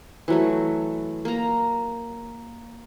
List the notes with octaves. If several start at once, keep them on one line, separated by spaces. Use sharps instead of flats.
E3 F#3 A3
A#3 A#5